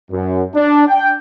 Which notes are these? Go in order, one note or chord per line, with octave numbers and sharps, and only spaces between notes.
F#2
D4
G5